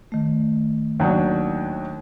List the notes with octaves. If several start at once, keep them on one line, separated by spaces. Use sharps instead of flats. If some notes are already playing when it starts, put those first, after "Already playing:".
D#3 A3
D#2 F#3 D4